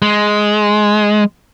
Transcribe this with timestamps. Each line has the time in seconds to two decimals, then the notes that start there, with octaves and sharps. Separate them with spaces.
0.02 G#3